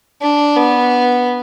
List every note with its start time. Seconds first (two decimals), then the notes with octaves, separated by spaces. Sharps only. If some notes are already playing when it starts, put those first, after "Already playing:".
0.22 D4
0.56 B3